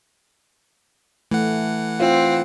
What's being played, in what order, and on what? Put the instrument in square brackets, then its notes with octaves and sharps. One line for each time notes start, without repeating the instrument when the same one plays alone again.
[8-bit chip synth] E3 F#5 [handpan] A3
[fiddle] C4 [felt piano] F4